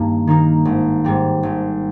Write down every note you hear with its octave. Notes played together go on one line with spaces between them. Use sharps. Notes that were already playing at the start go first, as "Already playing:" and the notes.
Already playing: G2 D#3 A#3 D#4
D#3 A#3 D#4
G#1
G#2 G3 C4
G#1